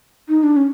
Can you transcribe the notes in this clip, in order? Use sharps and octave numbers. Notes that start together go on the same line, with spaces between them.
D#4
D4
C#4